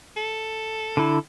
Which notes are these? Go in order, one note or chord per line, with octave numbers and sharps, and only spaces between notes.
A4
D3 E4